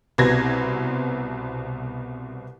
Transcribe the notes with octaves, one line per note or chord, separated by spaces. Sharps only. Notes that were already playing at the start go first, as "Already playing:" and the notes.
C2 B2 C4 B4 G#6 A#6